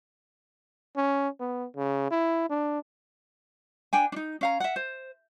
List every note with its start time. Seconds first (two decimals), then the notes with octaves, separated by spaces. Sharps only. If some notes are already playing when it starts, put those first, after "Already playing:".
0.97 C#4
1.40 B3
1.76 C#3
2.11 E4
2.50 D4
3.93 D4 G5 G#5
4.12 D4 D#4
4.41 C#4 F5 A#5
4.60 E5 F#5
4.76 C5